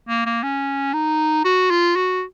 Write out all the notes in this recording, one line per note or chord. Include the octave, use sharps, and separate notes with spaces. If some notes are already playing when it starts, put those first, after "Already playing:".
A#3
A#3
C#4
D#4
F#4
F4
F#4